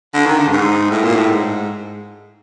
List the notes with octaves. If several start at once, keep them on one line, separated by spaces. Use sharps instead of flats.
D3
D#3
D3
G2
G#2
A2
A#2
A2
G#2